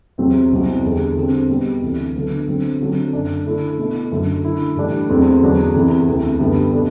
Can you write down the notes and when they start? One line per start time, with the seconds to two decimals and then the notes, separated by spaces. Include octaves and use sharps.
0.18 E2 C3 F#3 C4
0.52 C2 B2 F#3 C4 F#4
0.83 E2 D3 G3
1.16 D3 G3 C4
1.49 B2 G3 B3
1.82 D2 C3 E3
2.15 D3 F#3 B3
2.47 D3 F#3 C4
2.81 D3 F#3 C4
3.13 F#2 D3 A3 D4
3.46 D3 A3 E4
3.78 B2 A3 E4
4.11 F#2 D3 F#3
4.44 D3 A3 E4
4.76 A2 E3 G3 D4
5.09 E2 C3 F#3 A3 C4
5.42 E2 D3 F#3 B3 D4
5.75 E2 C3 E3 A3
6.08 D2 C3 E3 B3
6.40 F#2 D3 G3 B3
6.73 B2 A3 D4